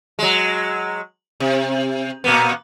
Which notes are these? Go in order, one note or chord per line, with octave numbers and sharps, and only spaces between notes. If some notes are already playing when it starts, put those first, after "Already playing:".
F#3 G#3
C3
A#2 A#3 B3